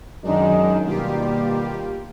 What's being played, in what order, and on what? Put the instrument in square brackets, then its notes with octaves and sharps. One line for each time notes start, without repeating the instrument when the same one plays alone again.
[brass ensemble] F#2 G#3 D#4 [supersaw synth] D#3 D4
[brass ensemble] B2 D#3 G3 [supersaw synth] A#3 F4 G4